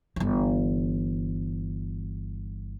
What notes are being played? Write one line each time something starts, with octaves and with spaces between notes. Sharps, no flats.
G1 E3